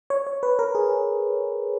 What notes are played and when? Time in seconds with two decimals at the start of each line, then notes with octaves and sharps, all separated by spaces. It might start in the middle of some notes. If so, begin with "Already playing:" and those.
0.10 C#5
0.27 C#5
0.43 B4
0.59 A#4
0.75 G#4